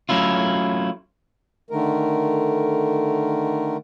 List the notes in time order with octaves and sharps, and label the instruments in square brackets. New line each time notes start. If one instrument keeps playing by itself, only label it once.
[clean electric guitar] F#3 A3 C#4 E4 F4
[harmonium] D3 D#3 A3 A#4